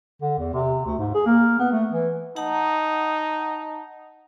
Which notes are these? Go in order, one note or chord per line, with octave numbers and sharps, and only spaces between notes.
D3
E2
C3
D2
G#2
G#4
A#3
B3
A3
E3
D#4 F#5 A5 A#5